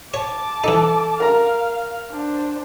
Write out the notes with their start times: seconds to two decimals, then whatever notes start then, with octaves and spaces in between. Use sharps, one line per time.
0.14 C#5 A5 D6
0.64 E3 D#4 A4
1.20 A#4 F5 A#5 F6
2.11 D4 C5